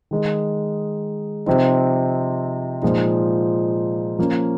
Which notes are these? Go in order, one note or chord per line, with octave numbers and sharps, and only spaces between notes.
D#3 G#3 D#4
C3 F3 C4 D#4
A#2 F3 G#3 D#4
F3 A#3 C#4